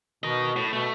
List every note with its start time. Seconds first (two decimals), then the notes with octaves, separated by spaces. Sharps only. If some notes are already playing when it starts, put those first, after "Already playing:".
0.24 B2 A#4 D#5
0.56 A2
0.73 B2 A3